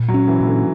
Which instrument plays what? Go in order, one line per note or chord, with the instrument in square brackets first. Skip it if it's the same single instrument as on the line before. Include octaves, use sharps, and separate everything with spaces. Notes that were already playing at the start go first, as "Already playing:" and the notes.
Already playing: [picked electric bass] A#2
[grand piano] F#3
[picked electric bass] C#4
[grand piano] E3
[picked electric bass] A#2
[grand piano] D3